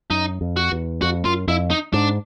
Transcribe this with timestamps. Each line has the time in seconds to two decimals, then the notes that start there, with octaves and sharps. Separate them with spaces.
0.10 F#2 D#4
0.41 F2
0.56 F#4
0.72 E2
1.02 F2 F#4
1.25 F#2 F4
1.48 F2 E4
1.70 D#4
1.93 G#2 D4